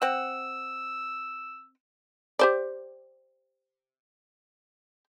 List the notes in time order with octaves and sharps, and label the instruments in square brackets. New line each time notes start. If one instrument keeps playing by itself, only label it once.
[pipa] C4 F#5 [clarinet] E6
[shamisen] G4 C5 D5